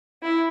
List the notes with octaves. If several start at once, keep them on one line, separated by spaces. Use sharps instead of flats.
E4